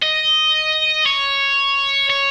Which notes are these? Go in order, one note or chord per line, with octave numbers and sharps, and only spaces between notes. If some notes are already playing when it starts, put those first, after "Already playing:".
D#5
C#5
C#5